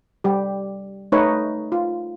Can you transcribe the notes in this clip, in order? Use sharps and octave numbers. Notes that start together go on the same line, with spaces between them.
G3 G4
A3 D#4 B4 C#5
F4